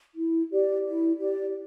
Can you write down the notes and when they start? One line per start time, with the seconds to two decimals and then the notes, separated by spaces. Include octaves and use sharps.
0.16 E4
0.50 G4 D5
0.84 E4
1.18 G4 D5